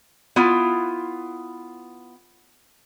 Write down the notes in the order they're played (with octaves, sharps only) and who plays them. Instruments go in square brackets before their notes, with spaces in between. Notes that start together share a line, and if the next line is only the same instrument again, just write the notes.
[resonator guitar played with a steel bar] B3 E4 F4